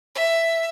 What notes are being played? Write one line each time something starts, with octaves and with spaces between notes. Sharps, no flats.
E5